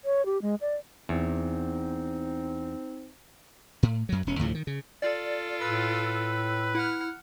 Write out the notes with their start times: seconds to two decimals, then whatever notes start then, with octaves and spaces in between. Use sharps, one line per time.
0.05 C#5
0.26 G4
0.42 G#3
0.61 D5
1.09 E2 C4 D#4
3.83 A2
4.09 F#2 F#3
4.27 E1 C#4
4.39 D2 A2 C#3 F3
4.55 D#3
4.67 C#3
5.02 F4 A4 D5
5.61 A2 B4 E6
6.75 E4 F#5 F6